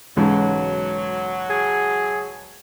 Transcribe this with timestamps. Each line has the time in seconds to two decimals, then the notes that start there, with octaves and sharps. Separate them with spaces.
0.17 B1 G#2 C#3 E3 F#3 G#3
1.50 G#4